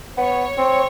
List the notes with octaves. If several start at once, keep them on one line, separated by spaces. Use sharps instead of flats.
B3 C#5
C4